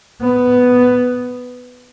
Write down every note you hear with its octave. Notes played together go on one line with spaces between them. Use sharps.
B3